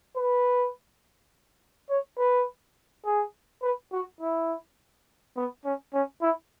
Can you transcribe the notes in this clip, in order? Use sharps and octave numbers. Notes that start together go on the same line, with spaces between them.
B4
C#5
B4
G#4
B4
F#4
E4
B3
C#4
C#4
E4